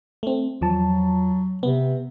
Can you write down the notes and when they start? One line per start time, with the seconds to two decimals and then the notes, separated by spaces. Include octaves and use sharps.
0.23 A3 C4
0.61 E2 F3 F#3 A5
1.63 C3 B3